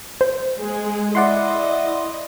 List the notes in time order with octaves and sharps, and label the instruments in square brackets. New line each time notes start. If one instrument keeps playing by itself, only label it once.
[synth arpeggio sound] C5
[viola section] G#3 G#4
[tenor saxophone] E4 [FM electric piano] D5 F#5 C6 [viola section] D#5